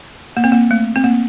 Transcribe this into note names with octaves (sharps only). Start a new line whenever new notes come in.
A#3
C4
A#3
A3
C4
A#3